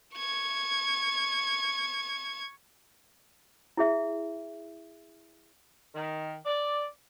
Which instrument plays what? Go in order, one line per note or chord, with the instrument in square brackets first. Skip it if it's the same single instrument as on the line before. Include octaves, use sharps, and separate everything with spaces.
[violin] C#6 G#6
[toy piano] E4 G#4 E5
[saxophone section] D#3
D5